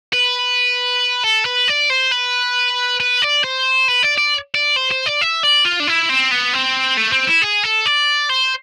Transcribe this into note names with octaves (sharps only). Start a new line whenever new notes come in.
B4
A4
B4
D5
C5
B4
B4
D5
C5
B4
D5
D5
D5
C5
C5
D5
E5
D5
F4
D4
E4
C4
B3
C4
A3
C4
E4
G#4
A4
D5
C5